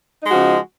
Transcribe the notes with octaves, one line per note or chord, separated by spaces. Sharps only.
C#3 F3 G#3 D#4 F#4